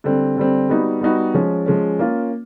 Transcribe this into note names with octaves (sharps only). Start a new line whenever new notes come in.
D3 G3 C4
D3 G3 C4
G3 B3 D#4 F#4
G3 B3 D#4 F#4
F3 G#3 C#4
F3 G#3 C#4
A#3 C#4 F4